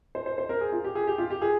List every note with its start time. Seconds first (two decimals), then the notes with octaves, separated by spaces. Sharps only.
0.15 C5
0.26 C5
0.38 C5
0.49 A#4
0.61 G#4
0.72 F4
0.84 G4
0.95 G#4
1.07 G4
1.18 F4
1.30 G4
1.42 G#4